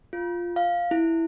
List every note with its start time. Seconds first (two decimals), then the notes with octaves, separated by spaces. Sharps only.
0.13 F4
0.56 F5
0.91 E4